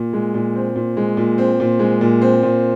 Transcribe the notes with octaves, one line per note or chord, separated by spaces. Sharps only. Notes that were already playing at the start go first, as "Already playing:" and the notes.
Already playing: A#2
G#3
A#2
C4
A#2
G#3
A#2
C4
A#2
G#3
A#2
C4
A#2